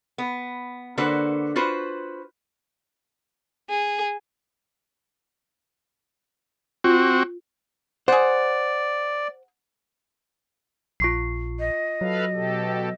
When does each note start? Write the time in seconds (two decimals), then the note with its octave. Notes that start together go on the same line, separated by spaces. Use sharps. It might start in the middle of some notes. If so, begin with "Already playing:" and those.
0.18 B3
0.98 D3 A#3 F#4 B4 C5
1.56 F4 F#4 B4 C5
3.70 G#4
6.84 C4 F4 F#4
8.08 G#4 C5 D5 F#5
11.00 A#1 F4 C#6 C7
11.60 D#5
12.01 F#3 A4 B4 F5
12.34 B2 G4 A4